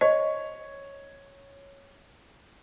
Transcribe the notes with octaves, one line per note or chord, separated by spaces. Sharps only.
C#5 D#5